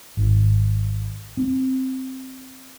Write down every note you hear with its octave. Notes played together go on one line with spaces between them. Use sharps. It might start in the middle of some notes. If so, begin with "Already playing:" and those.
G#1
C4